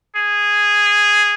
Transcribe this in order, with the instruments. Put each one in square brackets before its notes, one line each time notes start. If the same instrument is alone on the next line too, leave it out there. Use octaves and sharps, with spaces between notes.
[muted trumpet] G#4